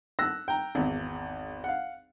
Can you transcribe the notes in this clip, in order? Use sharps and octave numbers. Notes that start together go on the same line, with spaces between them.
E6 F#6 A#6
G5 A#5
G#1 E2
F5 F#5